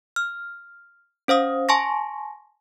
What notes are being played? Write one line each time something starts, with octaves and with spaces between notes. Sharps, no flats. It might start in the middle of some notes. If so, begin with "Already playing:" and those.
F6
C#4 C5 F5 D#6
G#5 A5 C6 C#6 A#6